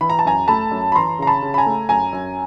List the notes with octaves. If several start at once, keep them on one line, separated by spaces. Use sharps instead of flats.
E3 B5
A#5
A5
F#2 G#5 A#5
A3 A5 B5
F#2
B5
E3 A#5 C6
C#3 A#5
A5 B5
C#3
B5
G#5 A#5
A3
F#2 G#5 A#5
F#2